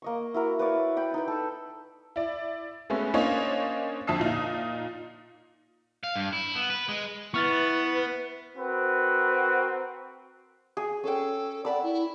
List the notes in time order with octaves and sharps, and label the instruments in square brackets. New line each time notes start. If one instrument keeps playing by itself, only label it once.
[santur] A#3 D#5 C#6
E4 F#4 A#4
B4 C#5 D5
D5 G5 B5
D#4 B4
A4 E6
[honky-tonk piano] E4 D5
G#3 A3 B3 C#4
A#3 C#4 D4 C5 C#5 D#5
F2 D3 E5 A5 D#6 C7
A#2 D#4 F5
[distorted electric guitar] F5
G2
E4
B3
B4
G#3
[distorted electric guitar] B3 [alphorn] E4 [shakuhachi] B4 [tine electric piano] C#6 F6 A6
[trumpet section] C4 F#4 A#4 B4
[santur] G#4
[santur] C#4 G5 [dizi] A4
[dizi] D5 [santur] F#5 B5 E6
[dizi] E4